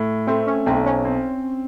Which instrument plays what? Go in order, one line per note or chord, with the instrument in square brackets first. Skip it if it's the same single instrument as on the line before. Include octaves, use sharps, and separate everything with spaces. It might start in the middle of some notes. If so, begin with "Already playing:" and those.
Already playing: [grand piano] A2
[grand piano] A3 [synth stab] C4
[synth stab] C#4
[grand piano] B1 [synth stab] C4
[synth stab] C#4
[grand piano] C4